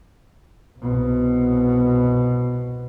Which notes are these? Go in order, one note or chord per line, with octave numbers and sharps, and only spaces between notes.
C2 B2